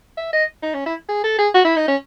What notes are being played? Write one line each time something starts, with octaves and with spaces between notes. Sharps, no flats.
E5
D#5
D#4
C#4
E4
G#4
A4
G#4
F#4
E4
D#4
C#4